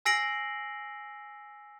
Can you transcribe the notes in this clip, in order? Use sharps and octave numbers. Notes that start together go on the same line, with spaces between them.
G#5 E6 A#6 C7 D7 F#7